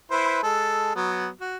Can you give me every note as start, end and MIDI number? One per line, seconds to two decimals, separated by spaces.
0.11 0.40 64
0.11 0.40 71
0.11 0.40 72
0.43 0.96 56
0.43 0.96 69
0.96 1.28 54
0.96 1.28 59
1.41 1.57 66